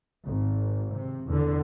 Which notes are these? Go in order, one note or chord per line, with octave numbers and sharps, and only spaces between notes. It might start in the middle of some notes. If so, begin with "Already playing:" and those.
G#1
C3
E2 D3